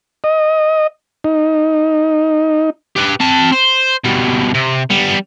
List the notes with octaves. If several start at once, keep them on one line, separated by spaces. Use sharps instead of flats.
D#5
D#4
G4 B4
C4 A5
C5
B2 G3
C3
G3 B3